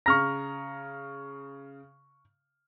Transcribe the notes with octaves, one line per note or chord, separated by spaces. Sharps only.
C#3 A#5 C#6 F6 A#6